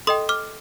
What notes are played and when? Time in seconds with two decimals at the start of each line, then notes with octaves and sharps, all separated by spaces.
0.07 A4 D#5 G5 C6 D#6
0.29 D6 F6